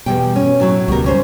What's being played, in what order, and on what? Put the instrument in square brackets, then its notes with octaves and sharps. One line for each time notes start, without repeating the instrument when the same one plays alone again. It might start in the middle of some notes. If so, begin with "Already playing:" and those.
[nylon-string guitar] E2 G3 G5 [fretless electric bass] B2
[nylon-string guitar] C#4
A2 F#3 E4
[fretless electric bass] C#2 G3 [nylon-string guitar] B2 A#4
[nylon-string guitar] D#2 C#4 C5